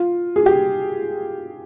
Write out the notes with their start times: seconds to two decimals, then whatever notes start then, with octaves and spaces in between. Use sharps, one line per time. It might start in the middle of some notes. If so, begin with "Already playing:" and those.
Already playing: F4
0.36 G#4
0.46 G4